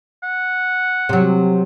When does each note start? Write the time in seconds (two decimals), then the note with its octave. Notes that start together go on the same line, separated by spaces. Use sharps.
0.23 F#5
1.09 C3 F#3